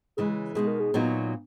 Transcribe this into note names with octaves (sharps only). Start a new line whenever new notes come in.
C#3 E3 G#3 G#4
B2 G#3 D#4 G#4
A#4
G#4
A#2 F#3 B3 D#4 F#4